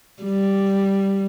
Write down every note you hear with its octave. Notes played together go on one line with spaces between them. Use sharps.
G3